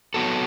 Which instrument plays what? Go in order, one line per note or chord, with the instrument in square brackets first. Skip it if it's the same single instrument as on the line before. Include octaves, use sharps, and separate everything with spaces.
[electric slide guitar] F#3 B3 F#4 A4